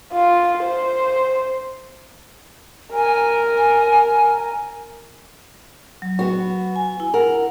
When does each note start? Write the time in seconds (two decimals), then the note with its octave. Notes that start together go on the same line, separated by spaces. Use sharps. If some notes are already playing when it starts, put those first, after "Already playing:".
0.13 F4
0.63 C5
2.93 A#4 G#5
6.02 F#3
6.19 B3 F#4
6.76 G#5
7.00 E4
7.14 A#4 F#5